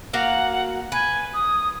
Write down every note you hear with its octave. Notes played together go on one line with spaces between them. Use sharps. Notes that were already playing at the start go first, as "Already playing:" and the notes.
A#3 F#4 F5 F#5
B4 G#5
D#6